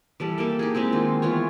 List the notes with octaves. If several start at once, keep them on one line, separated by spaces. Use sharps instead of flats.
E3 G3 A4
A#3 G4 A4
D#4 G4 G#4
G#3 A#3 C4 E4
D#3 D#4 F4
E3 B3 F4 C#5